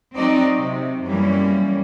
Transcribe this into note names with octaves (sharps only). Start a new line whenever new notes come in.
F#3 C4 D#4 F#4 D5
C3
F#2 E3 G3 A#3 C#4